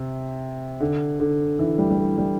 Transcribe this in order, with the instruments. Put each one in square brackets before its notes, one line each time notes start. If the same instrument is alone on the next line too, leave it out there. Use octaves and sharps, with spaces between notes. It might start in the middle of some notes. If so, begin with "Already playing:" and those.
Already playing: [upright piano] C3
D3
D3
E3
G3
G3
A3
G3